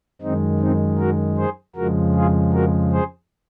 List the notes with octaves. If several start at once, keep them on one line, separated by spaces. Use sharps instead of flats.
F#2 D#3 G#3 C4 D#4
C4 D#4
F#4 A#4
G#4 C5
F2 C#3 F3 G#3 F#4 A#4
F4 G#4
F#4 A#4
G#4 C5